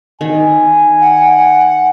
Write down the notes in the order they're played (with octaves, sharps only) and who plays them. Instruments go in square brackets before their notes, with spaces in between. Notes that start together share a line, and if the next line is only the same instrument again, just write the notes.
[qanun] D#3 [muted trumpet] G#5
[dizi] F#5